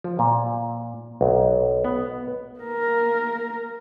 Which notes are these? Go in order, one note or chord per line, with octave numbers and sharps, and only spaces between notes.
F3
A#2
B1
B3
A#3 A#4